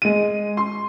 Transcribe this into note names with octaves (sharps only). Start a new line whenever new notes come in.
G#3 D#7
C6